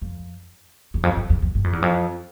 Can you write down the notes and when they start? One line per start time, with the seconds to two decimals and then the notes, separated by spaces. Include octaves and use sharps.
0.02 F2
0.94 E2
1.03 F2
1.17 G2
1.30 E2
1.42 F2
1.55 G2
1.64 F2
1.73 E2
1.82 F2